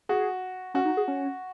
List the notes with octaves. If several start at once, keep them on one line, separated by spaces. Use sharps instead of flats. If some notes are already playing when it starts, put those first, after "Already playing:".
F#4 G#4
C#4 F#4
D#4
G#4
C#4